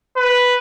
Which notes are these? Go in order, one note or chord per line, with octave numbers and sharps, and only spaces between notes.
B4